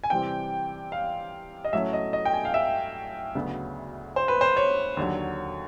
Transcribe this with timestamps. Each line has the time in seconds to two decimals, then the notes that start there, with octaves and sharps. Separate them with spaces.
0.04 G#5
0.10 C3 E3 G3 C4 G5
0.92 F5
1.65 D#5
1.73 A2 F#3 A3 C#4 E5
1.93 D#5
2.13 D#5
2.25 G5
2.34 G#5
2.45 F5
2.54 E5
3.35 D2 C#3 F#3 B3
4.16 C5
4.28 B4
4.41 C5
4.57 C#5
4.97 D#2 D3 F#3